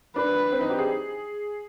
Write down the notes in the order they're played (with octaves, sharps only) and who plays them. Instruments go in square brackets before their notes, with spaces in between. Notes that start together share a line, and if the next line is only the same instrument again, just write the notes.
[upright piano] D4 [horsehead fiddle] B4
[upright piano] C4
D#4
G4
G#4